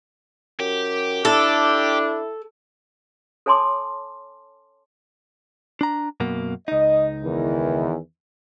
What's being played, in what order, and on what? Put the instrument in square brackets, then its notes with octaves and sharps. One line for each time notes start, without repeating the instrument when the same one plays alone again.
[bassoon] F#2 [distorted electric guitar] G4
[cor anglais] D4 [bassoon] E4 [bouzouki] A4
[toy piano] A4 C#5 G#5 A5 C6 D6
[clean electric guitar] D4 A#5
F#2 B2 A#3
[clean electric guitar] C#2 D#4 [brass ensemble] D#5
[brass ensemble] E2 D#3 E3